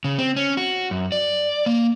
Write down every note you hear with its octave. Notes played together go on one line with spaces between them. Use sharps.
C#3
C4
C#4
F#4
F#2
D5
A#3